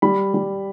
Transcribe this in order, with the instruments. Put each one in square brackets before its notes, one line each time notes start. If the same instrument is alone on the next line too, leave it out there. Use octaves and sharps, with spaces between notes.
[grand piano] G3 B5
G3